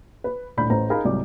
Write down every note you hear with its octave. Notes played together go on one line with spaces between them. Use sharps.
B4
D#1 A2 D4 B5 G6
A1 A3 B4 C5 A#5
D#4 G#4 A#4 F5 B5
C2 G#2 F#3 D5 D6